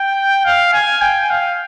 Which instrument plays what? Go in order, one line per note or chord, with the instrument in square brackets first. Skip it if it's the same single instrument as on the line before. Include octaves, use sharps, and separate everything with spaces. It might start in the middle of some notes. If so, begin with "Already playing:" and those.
Already playing: [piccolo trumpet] G5
F5
G#5
G5
F5